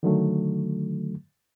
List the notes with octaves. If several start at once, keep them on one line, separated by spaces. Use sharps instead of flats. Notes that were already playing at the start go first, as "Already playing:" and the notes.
D3 D#3 F#3 A3